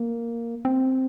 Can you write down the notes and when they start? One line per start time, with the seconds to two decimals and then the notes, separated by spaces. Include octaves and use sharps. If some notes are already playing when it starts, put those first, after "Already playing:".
Already playing: A#3
0.65 C4